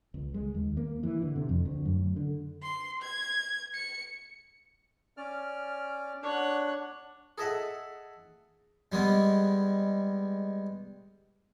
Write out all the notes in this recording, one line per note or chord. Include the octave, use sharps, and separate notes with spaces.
C#2
G#3
D#2
A#3
E3
D3
C3
F2
D2
F#2
D3
C6
G#6
C#7
C#4 D5 F6
D4 C#5 F#5
G#4 A4 D#5 E5 F#5
G3 G#3 B3